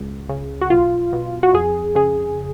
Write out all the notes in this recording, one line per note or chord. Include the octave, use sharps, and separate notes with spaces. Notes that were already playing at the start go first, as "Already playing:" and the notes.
Already playing: C#2
C#3
F#4
B1 F4
B2
F#4
F2 G#4
C#3 G#4